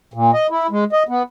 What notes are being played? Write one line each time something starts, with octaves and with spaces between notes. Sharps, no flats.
A#2
D#5
E4
G#3
D#5
B3